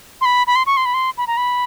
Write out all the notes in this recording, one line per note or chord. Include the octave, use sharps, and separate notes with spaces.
C6
B5
B5
C6
C#6
C6
B5
C6
B5
A#5
B5